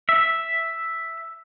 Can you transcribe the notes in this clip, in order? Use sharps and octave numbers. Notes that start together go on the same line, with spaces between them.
E5